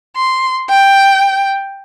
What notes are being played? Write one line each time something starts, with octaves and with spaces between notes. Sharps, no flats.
C6
G5